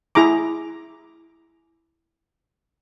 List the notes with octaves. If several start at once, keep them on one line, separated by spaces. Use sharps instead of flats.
E4 G#4 A#5 D6